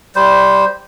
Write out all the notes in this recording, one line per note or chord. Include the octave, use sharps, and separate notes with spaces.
G3 C5